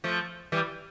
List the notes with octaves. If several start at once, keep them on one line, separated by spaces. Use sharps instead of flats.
F3 A3
E3 G3